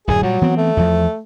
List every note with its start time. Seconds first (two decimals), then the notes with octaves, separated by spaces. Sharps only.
0.07 D1 F#2 G#4
0.23 A#2 F#3 G3
0.41 E3 B3 C4
0.57 A3
0.77 E2 F3